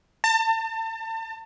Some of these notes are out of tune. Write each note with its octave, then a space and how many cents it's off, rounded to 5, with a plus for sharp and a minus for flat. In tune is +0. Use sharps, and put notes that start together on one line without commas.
A5 +35